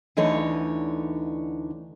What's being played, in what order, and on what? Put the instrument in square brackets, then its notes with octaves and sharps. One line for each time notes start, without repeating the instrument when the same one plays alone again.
[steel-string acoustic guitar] D2 D3 E3 D#4 C#5